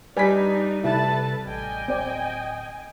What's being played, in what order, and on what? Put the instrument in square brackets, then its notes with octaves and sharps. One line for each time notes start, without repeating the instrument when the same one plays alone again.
[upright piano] G3 B6 [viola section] D4 D#4 [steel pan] B4 G#5
[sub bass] C3 [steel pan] E4 [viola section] A4 B4 A5
[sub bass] A1 [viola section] D#5 G5 G#5
[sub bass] D1 [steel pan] C4 D5